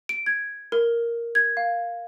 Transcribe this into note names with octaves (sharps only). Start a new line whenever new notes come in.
D7
G#6
A#4
G#6
F5